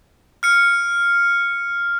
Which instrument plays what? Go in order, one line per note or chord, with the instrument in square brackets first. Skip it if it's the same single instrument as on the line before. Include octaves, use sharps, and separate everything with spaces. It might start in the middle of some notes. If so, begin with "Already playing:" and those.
[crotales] F6 C#7